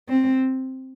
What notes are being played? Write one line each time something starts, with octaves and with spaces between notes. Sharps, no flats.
C4